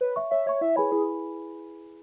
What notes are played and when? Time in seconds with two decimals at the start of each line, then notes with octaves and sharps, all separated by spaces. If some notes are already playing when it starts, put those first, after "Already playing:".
0.01 B4 C#5
0.16 E5 C#6
0.31 C#5 E5
0.46 C#5 E5 C#6
0.61 E4 E5
0.76 G#4 B4 C#5 G#5 B5
0.92 E4 G#4